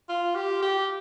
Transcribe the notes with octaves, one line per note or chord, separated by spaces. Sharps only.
F4
G4
G4